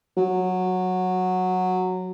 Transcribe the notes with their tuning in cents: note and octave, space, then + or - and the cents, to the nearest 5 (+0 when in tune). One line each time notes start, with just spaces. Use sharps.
F#3 -10